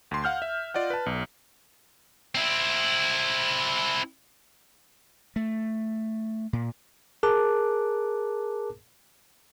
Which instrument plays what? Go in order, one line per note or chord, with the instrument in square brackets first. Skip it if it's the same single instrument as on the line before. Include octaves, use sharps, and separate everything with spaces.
[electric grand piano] D2 C6
F5 F#5 F6 G6
E5
F4 D5 D#5 F#5
B4 A5
B1
[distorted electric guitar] C4 E4
[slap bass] A3
A#2
[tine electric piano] G#4 A#4 A5 D6 F#6